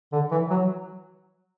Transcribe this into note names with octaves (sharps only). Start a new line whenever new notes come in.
D3
E3
F#3